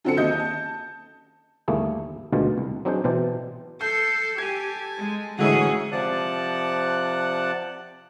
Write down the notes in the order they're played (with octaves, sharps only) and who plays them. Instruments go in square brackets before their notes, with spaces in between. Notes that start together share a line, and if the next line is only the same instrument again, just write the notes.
[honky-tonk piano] F#2 D3 C4 F#4 A4 C#7
F#1 D#2 D#5 G6
A5
[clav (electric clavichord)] G1 D#2 A3 A#3 E4 G#4
D2 B2 D3 D#3 G#3 F4
C2
F#3 C4 D4 D#4 G#4 C5
B2 E3 C5 D5 G5 A5
[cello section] A4 [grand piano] G6 [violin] C7
[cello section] G4 [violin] A4 G#5 [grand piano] G#6
[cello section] G#3
[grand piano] A1 E4 F#4 [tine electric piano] D3 G#3 [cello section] C#4 G#4
[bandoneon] C3 F3 D5 F#5 A5 F#6